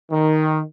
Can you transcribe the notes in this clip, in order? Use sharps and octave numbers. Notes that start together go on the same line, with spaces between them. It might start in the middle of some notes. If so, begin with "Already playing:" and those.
D#3